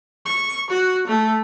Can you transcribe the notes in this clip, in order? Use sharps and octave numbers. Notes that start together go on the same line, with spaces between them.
C#6
F#4
A3